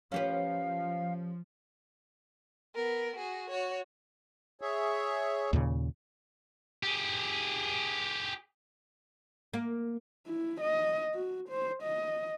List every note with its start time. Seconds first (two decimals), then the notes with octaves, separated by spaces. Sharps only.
0.12 F3 C#4 G4 B4 F5
2.75 B3 A#4
3.16 F#4 G#4
3.50 F#4 C#5
4.61 G#4 C#5 E5
5.53 D#2 A#2 C#3
6.83 G4 G#4
9.53 A#3
10.27 E4
10.61 D#5
11.14 F#4
11.49 C5
11.83 D#5